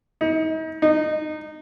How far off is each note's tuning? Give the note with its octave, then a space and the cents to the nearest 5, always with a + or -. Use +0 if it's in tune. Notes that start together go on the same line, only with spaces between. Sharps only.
D#4 +35
D#4 -20